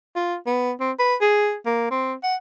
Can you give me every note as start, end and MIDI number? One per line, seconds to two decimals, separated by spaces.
0.16 0.36 65
0.46 0.72 59
0.80 0.92 60
0.99 1.15 71
1.21 1.55 68
1.66 1.91 58
1.91 2.14 60
2.23 2.35 78